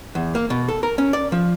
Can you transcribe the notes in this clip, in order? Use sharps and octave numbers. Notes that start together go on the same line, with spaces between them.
E2
A#3
B2
A4
A#4
C#4
D5
F3